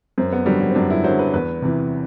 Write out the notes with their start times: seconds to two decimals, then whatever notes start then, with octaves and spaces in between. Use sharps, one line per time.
0.18 F#2 C4
0.33 B3
0.46 D3 F#3 G3
0.60 F#3
0.69 C4
0.75 F#2 D4
0.90 E4
1.04 D3 F#3 C5
1.19 B4
1.33 E2 B4
1.62 C3 E3